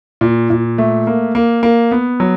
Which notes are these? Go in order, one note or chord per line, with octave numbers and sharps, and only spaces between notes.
A#2
A#2
A3
A#3
A#3
A#3
B3
F#3